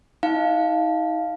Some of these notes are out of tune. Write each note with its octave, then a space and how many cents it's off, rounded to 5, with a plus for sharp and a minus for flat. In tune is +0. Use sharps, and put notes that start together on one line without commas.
D#4 +35 F5 +0